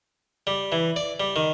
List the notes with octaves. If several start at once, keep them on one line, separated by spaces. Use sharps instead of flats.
G3
E3
D5
G3
D#3